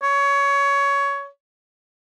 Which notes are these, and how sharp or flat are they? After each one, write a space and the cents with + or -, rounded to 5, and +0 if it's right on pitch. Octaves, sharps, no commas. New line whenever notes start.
C#5 +20